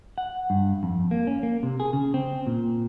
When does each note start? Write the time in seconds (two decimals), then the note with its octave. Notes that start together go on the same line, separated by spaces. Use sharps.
0.18 F#5
0.50 G2
0.83 F2
1.11 A#3
1.27 C#4
1.43 A#3
1.63 C3
1.80 G#4
1.93 C#3
2.14 C4
2.47 A#2